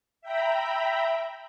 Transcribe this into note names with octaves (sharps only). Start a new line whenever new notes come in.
E5 G5 A#5 B5